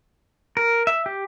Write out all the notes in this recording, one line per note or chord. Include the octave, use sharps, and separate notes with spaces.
A#4
E5
G4